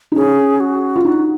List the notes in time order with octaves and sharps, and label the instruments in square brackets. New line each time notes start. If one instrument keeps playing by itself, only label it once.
[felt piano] D#4
[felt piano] C#4 [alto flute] G#4
[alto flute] F#4
[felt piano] F4
[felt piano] D#4 [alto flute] F#4